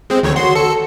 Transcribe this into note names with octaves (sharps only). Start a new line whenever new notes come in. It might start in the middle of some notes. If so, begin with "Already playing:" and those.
G#3 C4
D2 D#3 C#5
F#4 C6
A4 C#7